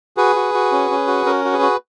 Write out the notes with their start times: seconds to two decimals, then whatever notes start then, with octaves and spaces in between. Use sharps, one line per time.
0.17 F#4 G#4 B4
0.36 F#4
0.54 F#4
0.72 C#4
0.91 C#4
1.07 F#4
1.26 C#4 A#4
1.45 F#4
1.53 G#4 B4
1.62 F#4